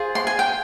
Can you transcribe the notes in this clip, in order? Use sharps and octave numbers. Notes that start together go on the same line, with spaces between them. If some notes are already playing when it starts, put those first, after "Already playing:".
Already playing: F4 G#4 C5
C6
G#5
G5